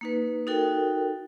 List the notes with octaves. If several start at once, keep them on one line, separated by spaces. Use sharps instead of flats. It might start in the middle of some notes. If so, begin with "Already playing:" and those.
A#3 D#4 B4
D#4 F#4 A4 A#4 G5